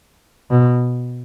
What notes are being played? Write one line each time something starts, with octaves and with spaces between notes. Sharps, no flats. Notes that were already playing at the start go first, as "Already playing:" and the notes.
B2